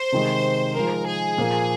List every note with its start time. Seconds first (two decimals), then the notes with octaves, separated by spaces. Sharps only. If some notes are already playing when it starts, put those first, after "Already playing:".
Already playing: C5
0.12 C3 D#3 G#3
0.75 F3 G#3 D#4 G#4 A#4
1.06 G#4
1.38 A#2 F3 A#3